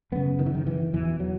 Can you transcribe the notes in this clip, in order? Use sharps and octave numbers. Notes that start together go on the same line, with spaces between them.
F#2 C#3 B3
D#3
E3
D#3
E3
E2 B2 E3
F#3